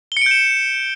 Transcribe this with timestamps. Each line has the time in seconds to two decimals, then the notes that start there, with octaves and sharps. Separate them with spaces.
0.12 G7
0.17 C#7
0.21 D7
0.26 G6
0.31 E7